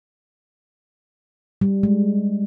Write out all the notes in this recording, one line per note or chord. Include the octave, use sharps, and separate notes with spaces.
G3
G#3